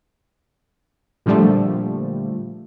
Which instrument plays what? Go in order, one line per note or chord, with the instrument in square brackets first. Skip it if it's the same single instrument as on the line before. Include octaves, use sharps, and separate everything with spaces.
[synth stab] A#2 D3 F3 G3 A3